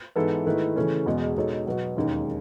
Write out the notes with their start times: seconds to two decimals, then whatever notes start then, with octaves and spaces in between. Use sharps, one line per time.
0.16 G#2 E3 B3 E4 A4
0.46 G#2 D#3 A3 E4 B4
0.76 C#3 E3 A3 C#4
1.06 E2 B2 G#3
1.36 B2 G#3 D#4 A4 C#5
1.67 B2 F#3 B3 F#4
1.96 E1 D#2 D#3 G#3 C#4